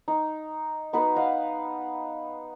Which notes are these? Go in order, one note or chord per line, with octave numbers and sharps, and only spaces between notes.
D#4
B3 D#4 F#4 B4
D#5 F5 F#5